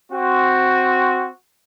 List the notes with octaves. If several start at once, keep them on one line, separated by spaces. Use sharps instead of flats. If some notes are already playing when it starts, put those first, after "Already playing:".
C4 F#4